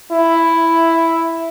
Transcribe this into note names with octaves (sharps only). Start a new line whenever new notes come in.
E4